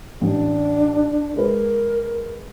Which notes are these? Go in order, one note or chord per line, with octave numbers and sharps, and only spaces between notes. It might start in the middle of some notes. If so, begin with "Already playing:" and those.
A1 D4
G#3 A#4 B4